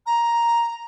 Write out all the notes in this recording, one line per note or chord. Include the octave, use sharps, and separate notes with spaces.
A#5